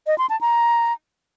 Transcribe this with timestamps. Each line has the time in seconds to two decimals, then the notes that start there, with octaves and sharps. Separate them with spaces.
0.07 D#5
0.18 C6
0.30 A5
0.41 A#5